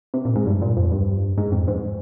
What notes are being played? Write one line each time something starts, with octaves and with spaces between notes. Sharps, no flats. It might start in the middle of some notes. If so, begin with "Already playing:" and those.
C3
A#2
G#2
G2
A#2
F2
G2
G#2
F2
G#2